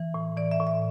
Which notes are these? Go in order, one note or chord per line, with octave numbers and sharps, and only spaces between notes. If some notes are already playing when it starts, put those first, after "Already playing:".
Already playing: E3
A2
E3 D5
E5
A2
E5